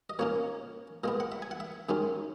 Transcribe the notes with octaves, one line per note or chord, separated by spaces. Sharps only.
D#5
A#2 A#3 C#4 C#5
A#2 G#3 B3 D#5
F#5
E5
G#5
F#5
E5
F#2 D#3 G#3 C#4